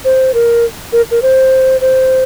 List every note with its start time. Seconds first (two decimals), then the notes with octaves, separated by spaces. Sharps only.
0.04 C5
0.34 A#4
0.92 A#4
1.11 A#4
1.22 C5
1.81 C5